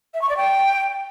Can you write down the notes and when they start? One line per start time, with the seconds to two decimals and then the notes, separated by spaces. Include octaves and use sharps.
0.14 E5
0.22 C#6
0.29 D5
0.37 G5